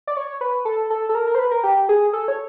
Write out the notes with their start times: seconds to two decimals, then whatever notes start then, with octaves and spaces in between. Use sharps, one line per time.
0.07 D5
0.17 C#5
0.41 B4
0.65 A4
0.90 A4
1.09 A4
1.15 A#4
1.27 A#4
1.35 C5
1.39 B4
1.51 A#4
1.64 G4
1.89 G#4
2.13 A4
2.28 C#5